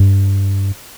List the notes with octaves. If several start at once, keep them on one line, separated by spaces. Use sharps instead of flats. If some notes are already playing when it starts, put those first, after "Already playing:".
Already playing: G2